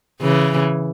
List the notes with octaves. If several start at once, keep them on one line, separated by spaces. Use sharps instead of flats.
C#3 E3